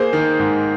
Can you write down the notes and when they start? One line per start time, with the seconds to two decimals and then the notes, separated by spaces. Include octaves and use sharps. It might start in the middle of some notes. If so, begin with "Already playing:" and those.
Already playing: A#3 G#4 C5
0.13 D#3
0.40 G#2